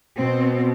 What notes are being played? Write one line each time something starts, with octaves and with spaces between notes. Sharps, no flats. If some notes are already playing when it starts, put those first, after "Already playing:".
B2 C4